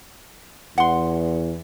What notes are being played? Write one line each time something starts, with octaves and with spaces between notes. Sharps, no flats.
E2 F#5 C6